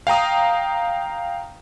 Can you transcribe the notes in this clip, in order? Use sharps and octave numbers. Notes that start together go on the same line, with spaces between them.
F5 G5 A#5 D#6